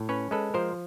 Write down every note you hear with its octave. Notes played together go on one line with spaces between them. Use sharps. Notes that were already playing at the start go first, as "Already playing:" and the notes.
Already playing: A2
C#4 B4 C#5
G#3 A4 B4
F3 A#4 C5